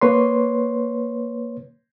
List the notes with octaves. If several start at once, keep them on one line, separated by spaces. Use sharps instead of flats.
A#3 B4 C#5 C6